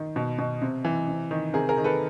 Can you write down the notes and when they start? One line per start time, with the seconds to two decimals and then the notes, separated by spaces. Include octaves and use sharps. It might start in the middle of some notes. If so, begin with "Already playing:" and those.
Already playing: D#3
0.16 B2
0.38 B2
0.62 C3
0.85 E3
1.08 C3
1.31 D#3
1.54 C3 G#4 A#4
1.69 G#4 A#4
1.78 D#3
1.84 A4 B4